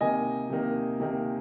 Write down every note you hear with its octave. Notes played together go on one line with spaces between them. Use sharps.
C3 D#3 A#3 D#5 G#5
C3 D#3 A#3
C3 D#3 A#3